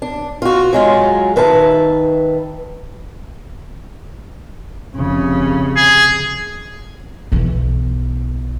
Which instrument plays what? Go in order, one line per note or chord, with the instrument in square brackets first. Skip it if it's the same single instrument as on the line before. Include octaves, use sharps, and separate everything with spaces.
[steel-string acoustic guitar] D4
F4 F#4
F#3 G#3 F4
D#3 B4 E5 A5
[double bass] F1 C#3
[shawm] G#4
[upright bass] B1 E3